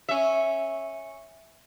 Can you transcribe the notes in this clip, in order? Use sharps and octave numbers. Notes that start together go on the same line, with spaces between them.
C#4 E5